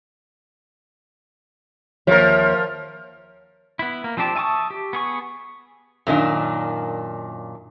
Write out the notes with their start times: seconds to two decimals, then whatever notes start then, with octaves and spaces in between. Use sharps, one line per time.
2.07 D#2 F3 A#4 C#5 E5
3.79 B3 E4
4.04 A#3
4.17 F3 C4 D4 G4 A5
4.35 E5 G#5 A5 C#6 D#6
4.71 G4
4.93 B3 G#4 C#6
6.07 F#2 A#2 D#3 D4